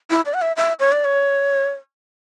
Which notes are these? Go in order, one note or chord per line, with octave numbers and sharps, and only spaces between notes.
E4
D5
F#5
E5
E5
C#5
D5
C#5